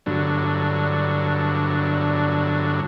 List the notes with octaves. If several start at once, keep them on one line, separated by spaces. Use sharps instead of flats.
G2 D3 F#3